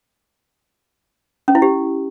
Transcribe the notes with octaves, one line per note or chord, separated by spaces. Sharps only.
C#4
E4
G4